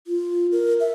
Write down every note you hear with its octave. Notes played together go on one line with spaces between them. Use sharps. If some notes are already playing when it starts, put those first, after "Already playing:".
F4
A#4
E5